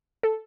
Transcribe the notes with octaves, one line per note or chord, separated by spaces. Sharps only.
A4